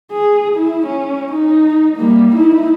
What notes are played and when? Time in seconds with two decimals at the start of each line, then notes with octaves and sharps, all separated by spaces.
0.11 G#4
0.56 E4
0.87 C#4
1.32 D#4
1.96 G3 A#3
2.35 D#4 E4